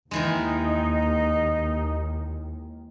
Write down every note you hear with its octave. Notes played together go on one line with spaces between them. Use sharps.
D#2 D#3 E3 G#3 D#4